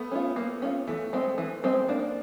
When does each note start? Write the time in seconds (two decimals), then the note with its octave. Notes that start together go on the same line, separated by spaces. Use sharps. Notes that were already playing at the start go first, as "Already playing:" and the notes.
Already playing: A3 B3
0.12 C#4 F4
0.36 A#3
0.62 C#4 F4
0.88 E3 A3
1.13 G#3 C4
1.38 E3
1.64 G#3 C4
1.88 A#3 D4